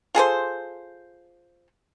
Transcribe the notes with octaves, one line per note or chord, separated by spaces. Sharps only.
F4 G#4 A4 C5